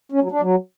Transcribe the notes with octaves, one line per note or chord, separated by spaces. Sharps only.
C#4
F#3
D4
F#3